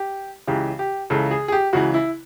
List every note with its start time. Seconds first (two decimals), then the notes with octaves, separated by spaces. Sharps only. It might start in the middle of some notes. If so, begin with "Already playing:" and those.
Already playing: G4
0.48 C#2 C#3 E3 G4
0.79 G4
1.10 C#2 C#3 E3 A4
1.31 G#4
1.48 G#4
1.52 G4
1.73 C#2 C#3 E3 F#4
1.94 E4